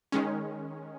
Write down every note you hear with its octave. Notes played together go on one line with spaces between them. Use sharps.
D#3 G#3 C#4